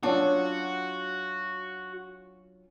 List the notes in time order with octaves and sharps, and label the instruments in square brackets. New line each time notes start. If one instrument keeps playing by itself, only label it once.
[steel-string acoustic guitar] F#3 C#4 F4 [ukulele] D4 [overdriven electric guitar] F#4